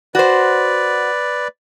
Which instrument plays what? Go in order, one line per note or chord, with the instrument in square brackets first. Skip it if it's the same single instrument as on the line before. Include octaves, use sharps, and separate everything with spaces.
[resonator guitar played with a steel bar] F#4 C5 [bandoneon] B4 D5